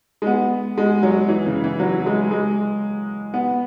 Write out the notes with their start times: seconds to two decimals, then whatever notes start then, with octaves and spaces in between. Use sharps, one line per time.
0.22 G#3
0.27 B3
0.78 G#3
1.03 F#3
1.28 E3
1.46 C#3
1.64 E3
1.80 F#3
2.06 G#3
2.31 G#3
3.34 B3